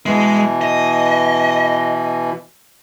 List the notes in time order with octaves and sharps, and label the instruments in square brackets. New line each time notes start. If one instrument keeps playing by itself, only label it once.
[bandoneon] B2 E3 [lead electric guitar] G#3
[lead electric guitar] D#5